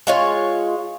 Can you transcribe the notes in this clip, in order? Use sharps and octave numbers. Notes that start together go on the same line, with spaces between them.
G#3 F4 C#5